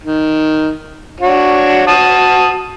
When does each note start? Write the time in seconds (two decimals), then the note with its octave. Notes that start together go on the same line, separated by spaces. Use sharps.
0.04 D#3
1.20 D4 F#4 C#5
1.87 F#4 A5 D#6